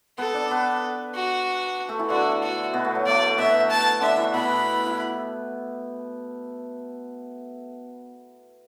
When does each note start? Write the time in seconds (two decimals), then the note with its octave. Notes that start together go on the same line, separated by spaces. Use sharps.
0.18 B3 A4 B4
0.34 D4 D5
0.51 B3 B4
1.14 F#4
1.89 A3 A4
1.99 E3 E4
2.10 D3 D4 F#4
2.42 F#4
2.73 B2 B3
2.85 A3
2.95 F#3
3.06 A3 D5
3.22 A3
3.38 B2 B3 E5
3.70 A5
4.01 D3 D4 E5
4.17 E3 E4
4.34 B2 B3 B5
4.86 E4